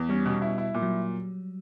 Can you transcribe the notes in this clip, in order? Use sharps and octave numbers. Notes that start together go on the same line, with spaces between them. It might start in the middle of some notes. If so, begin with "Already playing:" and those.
Already playing: E2 B3
G3 C#4
B2
E4
E4
A#2
F#3